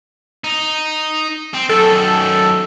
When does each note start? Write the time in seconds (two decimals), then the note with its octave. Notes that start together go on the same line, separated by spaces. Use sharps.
0.44 D#4
1.54 C4
1.69 F#2 D#3 A4